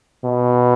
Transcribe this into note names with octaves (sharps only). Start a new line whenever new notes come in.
B2